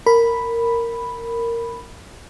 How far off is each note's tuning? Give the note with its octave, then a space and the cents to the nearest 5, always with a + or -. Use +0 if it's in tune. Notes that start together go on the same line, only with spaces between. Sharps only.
A#4 -10 B5 +0